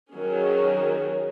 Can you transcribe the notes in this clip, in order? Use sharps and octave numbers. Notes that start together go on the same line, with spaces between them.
D#3 F#3 C#4 G#4